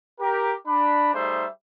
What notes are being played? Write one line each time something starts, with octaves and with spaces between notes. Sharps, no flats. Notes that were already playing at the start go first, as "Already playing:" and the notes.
G4 A#4
D4 B5
G3 A3 D#4 G#4 C5 E5